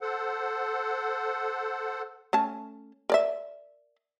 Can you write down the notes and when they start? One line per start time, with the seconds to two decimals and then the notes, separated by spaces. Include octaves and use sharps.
0.01 A4 C5 F#5
2.33 A3 C#4 A5
3.10 A#4 D5 E5